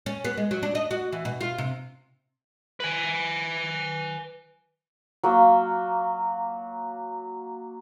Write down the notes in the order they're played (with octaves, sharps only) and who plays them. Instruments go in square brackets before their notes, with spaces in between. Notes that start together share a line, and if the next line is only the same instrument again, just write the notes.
[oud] C#4
B3
G#3
F#3
D4
D#5
F#4
E3
B2
F4
C3
[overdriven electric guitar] B4 G#5
[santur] F#3 A#3